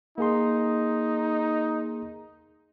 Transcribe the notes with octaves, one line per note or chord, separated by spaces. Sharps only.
A#3 D#4 G#4 C6